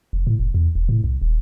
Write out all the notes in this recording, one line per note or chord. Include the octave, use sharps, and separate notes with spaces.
F1
A2
F1
E2
E1
A2
C2
D#1